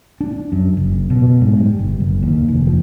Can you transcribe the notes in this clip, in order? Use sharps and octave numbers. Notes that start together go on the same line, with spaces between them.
D4
F#2
F#1
B2
G#2
G3
G1
F#1
D#2
F1
F3